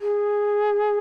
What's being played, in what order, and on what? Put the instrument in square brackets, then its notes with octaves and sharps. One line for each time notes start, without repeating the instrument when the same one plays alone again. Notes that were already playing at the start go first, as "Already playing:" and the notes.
[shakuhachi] G#4